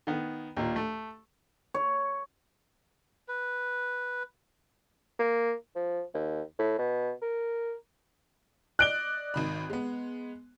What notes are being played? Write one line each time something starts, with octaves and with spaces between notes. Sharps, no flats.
D#3 B3
D#2 A#2
A3
C#5
B4
A#3
F3
D#2
A2
B2
A#4
D5 D#5 F#6 D7 G7
G#1 D#3 B5
G#3 B3